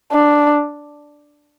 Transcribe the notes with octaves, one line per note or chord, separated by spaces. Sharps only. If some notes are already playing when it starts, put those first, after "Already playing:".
D4